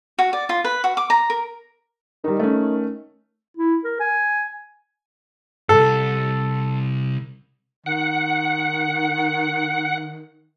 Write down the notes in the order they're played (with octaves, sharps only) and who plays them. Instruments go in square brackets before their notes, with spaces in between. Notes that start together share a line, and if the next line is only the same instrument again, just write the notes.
[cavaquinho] F#4
D5
F4
B4
F#4
D6
A#5
A#4
[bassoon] D#3 [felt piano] G3 D#4
[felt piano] A3 C#4
[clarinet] E4
A#4
G#5
[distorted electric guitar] C2 G#2 [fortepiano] A4
[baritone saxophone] D#3 [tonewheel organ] F#5